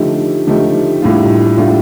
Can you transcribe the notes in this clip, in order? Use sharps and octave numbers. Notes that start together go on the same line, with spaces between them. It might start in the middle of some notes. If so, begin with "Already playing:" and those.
Already playing: D3 F3 A3 D#4 G4
D3 F3 A3 D#4 G4
A2 G3 D4 F4
A2 G3 D4 F4